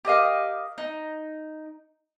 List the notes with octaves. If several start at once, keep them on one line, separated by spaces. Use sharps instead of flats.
G4 A#4 D#5 F5
D#4